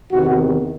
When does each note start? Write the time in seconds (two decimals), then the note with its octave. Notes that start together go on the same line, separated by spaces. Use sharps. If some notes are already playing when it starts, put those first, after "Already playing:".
0.12 E2 C3 D#3 F#4